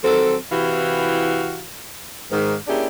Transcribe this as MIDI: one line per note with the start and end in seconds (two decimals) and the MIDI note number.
0.03 0.34 51
0.03 0.34 54
0.03 0.34 60
0.03 0.34 69
0.50 1.62 48
0.50 1.62 52
0.50 1.62 64
0.50 1.62 66
0.50 1.62 67
0.50 1.62 77
2.30 2.54 44
2.30 2.54 51
2.67 2.86 58
2.67 2.86 61
2.67 2.86 62
2.67 2.86 64
2.67 2.86 67
2.67 2.86 68